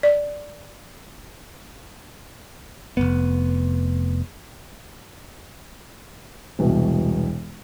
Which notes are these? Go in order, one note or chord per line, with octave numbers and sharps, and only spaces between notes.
D5
F1 F#2 B3
E1 C2 B2